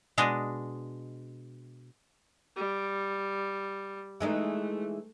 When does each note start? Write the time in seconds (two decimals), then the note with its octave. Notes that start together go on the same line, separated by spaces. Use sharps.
0.18 B2 G#3 D4 D#5
2.56 G3
4.20 E3 G#3 A3 D#4